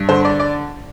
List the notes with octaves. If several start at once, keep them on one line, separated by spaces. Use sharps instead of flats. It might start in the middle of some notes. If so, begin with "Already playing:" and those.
Already playing: G2
D3 C5
D5
D5